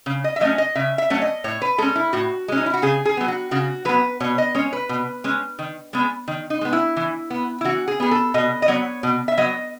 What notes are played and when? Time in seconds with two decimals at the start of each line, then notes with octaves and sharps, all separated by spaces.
0.06 C#3
0.24 D#5
0.36 E5
0.41 F#3 A3 C#4 D#5
0.58 D#5
0.75 C#3 E5
0.98 E5
1.10 F#3 A3 C#4 C#5
1.22 D#5
1.44 A2 C#5
1.62 B4
1.78 G#3 C#4 A4
1.96 E4
2.13 A2 F#4
2.48 G#3 C#4
2.57 D#4
2.66 E4
2.74 F#4
2.82 C#3 G#4
3.05 G#4
3.17 F#3 B3
3.28 F#4
3.51 C#3 F#4
3.85 F#3 B3 B4
4.20 B2 C#5
4.38 D#5
4.54 G#3 C#4 C#5
4.73 B4
4.89 B2
5.24 G#3 C#4
5.59 D#3
5.93 G#3 B3
6.28 D#3
6.50 D#4
6.61 G#3 B3
6.73 E4
6.96 E3
7.30 B3
7.61 E4
7.65 E3 F#4
7.88 G#4
8.00 B3 G#4
8.11 A4
8.34 B2 D#5
8.62 D#5
8.68 F#3 B3 C#5
9.03 B2
9.28 E5
9.37 F#3 B3 D#5